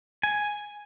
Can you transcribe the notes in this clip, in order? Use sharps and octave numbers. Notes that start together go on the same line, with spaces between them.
G#5